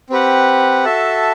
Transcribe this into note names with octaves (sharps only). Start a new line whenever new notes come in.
C4 G4 B4 F#5
F#4 A4 E5 A5